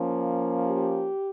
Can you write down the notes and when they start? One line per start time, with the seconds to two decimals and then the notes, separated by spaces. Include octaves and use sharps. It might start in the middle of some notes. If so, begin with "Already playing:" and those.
Already playing: F3 A#3 C#4
0.64 G4